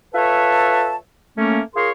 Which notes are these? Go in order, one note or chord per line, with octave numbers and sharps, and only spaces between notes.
F4 A4 B4 C#5 E5 A5
A3 A#3 C#4
F4 G#4 A#4 C#5 C6